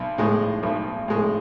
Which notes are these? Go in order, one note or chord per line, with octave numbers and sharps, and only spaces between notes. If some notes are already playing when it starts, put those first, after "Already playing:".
Already playing: B1
A2 G#3
B1
A2 G#3